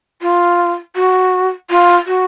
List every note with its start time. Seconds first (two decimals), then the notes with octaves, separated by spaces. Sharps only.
0.22 F4
0.96 F#4
1.70 F4
2.07 F#4